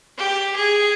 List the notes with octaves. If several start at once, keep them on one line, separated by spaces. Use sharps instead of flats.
G4
G#4